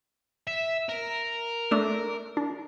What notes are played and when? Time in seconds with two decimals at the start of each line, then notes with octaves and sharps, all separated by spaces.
0.48 E5
0.89 A#4
1.71 A3 D4
2.37 D4